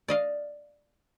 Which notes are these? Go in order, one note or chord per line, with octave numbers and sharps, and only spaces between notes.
D5 D#5 F5